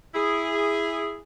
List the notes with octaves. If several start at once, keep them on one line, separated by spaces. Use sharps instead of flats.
E4 G#4